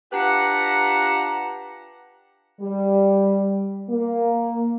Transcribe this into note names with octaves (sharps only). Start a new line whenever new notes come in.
D4 F4 G4 B4 F#5 A#5
G3
A#3